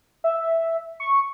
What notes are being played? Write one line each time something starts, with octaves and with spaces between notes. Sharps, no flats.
E5
C#6